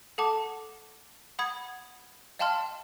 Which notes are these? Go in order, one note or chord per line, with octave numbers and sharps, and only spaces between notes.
A4 F#5 A5 D6
F#5 B5 D#6 G#6
D#5 F5 G5 A5 C6 F6